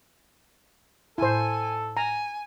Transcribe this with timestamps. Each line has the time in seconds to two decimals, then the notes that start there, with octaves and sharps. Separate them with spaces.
1.18 A2 D#4 E4 A4 C5 G#5
1.97 G#5 A#5